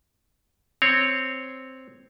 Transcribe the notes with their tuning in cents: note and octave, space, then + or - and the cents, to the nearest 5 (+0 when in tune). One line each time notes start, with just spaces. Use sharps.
C4 +0 C#5 +0